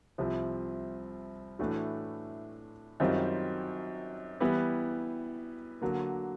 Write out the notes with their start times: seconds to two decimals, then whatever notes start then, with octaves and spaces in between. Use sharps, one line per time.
0.18 C2 C3 F3
1.59 A2 E3 A3 D4 F#4
3.00 F#2 D#3 G3 C4 F4
4.40 E3 G3 B3 E4
5.82 D3 F#3 A#3